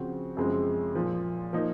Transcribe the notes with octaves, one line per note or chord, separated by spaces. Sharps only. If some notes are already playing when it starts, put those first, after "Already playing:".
Already playing: C#3 F3 C4 F#4 C5
F#2 C#3 F3 G#3 C4
A#2 F3 A#3
F3 A#3 D#4